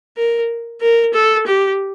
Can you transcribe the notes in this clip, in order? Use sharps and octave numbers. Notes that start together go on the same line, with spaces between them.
A#4
A#4
A4
G4